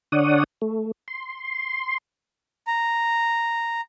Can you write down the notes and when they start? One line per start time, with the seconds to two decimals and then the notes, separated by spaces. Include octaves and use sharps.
0.12 D3 D4 C#5 D5 F#5 D#6
0.62 A3
1.08 C6
2.67 A#5